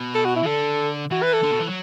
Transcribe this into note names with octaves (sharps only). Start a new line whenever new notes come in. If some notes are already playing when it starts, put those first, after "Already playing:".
Already playing: B2
A4
F#4
E4
E3
D3 A4
E3 F#4
B4
A4
D3
B2
E3
F#3